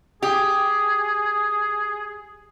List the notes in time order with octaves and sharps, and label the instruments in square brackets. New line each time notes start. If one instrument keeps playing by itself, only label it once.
[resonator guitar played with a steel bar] G4 [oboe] G#4